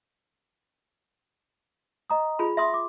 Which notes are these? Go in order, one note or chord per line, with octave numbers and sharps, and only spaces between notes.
D#5 A#5 D#6
F4 G#4 B5
E5 C6 D#6 A#6
D6